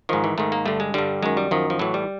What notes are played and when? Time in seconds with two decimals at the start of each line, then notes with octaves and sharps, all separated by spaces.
0.09 G#2 D#3 F3
0.24 E3
0.38 G#2 D#3 A3
0.52 A#3
0.66 G2 D3 A3
0.80 G#3
0.94 G2 D3 G3
1.23 F#2 D#3 G#3
1.37 G3
1.51 F#2 D#3 F3
1.70 F3
1.79 A2 E3 F#3
1.94 G3